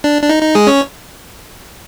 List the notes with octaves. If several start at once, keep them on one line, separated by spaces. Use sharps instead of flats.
D4
D4
D#4
D#4
G#3 G#4
C#4 C#5